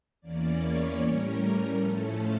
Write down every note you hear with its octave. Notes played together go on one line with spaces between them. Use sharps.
E2 E3 A#3 C#4 D5
C#5
A2 G3 C#4 A#4
A2 F3 A3 C#4 A4